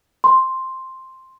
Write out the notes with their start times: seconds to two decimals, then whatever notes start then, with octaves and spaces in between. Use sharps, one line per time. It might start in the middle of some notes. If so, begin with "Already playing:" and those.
0.24 C6